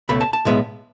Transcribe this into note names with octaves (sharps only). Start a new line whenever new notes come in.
C#2 B2 A3 B5
A5
A5
B1 A2 G#3 B3